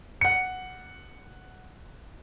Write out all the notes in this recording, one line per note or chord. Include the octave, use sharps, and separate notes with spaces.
F#5 C#7